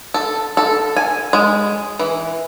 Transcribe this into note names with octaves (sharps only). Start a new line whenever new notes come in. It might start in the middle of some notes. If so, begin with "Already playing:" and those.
A4
A4
G#5
G#3
E3